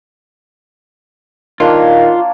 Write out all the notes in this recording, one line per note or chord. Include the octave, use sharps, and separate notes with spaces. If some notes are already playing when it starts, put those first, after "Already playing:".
D#3 A#3 D4 F4 C#5